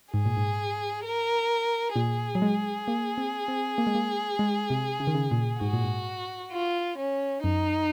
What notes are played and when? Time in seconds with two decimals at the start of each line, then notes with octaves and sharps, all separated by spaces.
0.14 G#2 G#4
0.26 A#2
0.37 G#2
1.05 A#4
1.96 A#2 G#4
2.35 F#3
2.42 G#3
2.88 A#3
3.18 C4
3.48 C4
3.78 A#3
3.87 G#3
3.95 A#3
4.39 G#3
4.70 C3
5.00 C#3
5.07 D#3
5.15 C#3
5.31 A#2
5.61 G#2 F#4
5.73 A#2
5.84 G#2
6.52 F4
6.98 C#4
7.44 F#2 D#4